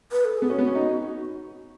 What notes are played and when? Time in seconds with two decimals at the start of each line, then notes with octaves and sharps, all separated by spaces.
0.12 B4
0.25 A4
0.37 B3 G#4
0.50 C#4 F#4
0.58 B3
0.67 C#4
0.75 D#4